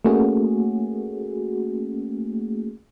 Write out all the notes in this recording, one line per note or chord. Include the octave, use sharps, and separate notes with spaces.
A3 A#3 C#4 F#4 G#4